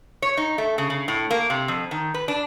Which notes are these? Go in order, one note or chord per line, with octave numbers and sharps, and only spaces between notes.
C#5
D#4
A3
C#3
C#3
A2
A#3
C3
F2
D#3
B4
D4